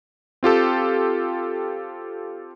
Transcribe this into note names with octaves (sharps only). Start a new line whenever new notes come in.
C4 F4 G4 A4